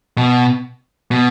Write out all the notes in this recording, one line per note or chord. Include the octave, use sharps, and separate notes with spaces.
B2
B2